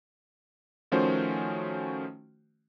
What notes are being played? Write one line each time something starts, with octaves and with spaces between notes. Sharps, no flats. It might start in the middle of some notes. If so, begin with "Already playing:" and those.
D#3 F3 A3 C#4 F#4 C5